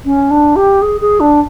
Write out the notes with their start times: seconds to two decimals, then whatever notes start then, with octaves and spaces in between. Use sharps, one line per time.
0.05 C#4
0.31 D4
0.56 G4
0.82 G#4
1.01 G#4
1.20 D4